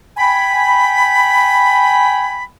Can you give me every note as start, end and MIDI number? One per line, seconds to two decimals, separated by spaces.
0.17 2.43 79
0.17 2.43 80
0.17 2.43 83